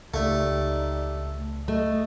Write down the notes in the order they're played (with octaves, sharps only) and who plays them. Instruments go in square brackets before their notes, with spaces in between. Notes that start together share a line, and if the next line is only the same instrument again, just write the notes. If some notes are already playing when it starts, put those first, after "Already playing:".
[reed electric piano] C#2 [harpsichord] A3 [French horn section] D#4 G4 D5
[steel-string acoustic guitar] A3 [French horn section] D#5